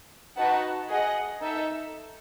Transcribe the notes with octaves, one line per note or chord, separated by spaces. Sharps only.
D#4 F#4 B4 F#5 A5
G#4 D#5 F#5
D#4 A4 E5